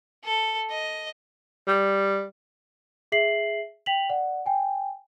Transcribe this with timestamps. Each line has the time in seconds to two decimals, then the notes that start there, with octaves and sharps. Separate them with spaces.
0.25 A4
0.70 D#5
1.68 G3
3.12 G#4 E5 B6 C7 F#7
3.86 G5 B6 F7 F#7
4.10 D5 F#5
4.46 G5 G#5